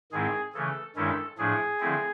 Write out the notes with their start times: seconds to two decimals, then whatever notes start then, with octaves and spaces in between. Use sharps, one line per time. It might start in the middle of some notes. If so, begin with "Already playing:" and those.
0.12 G#2 D#3 G#3 C4 E4 G#4
0.53 C#3 E3 A3 C#4 A4
0.96 G2 D#3 G#3 C#4 E4 A4
1.38 A2 F3 A3 D4 G#4
1.80 D3 F3 A3 C4 E4